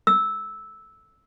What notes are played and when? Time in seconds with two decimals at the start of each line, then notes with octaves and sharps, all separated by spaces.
0.07 E6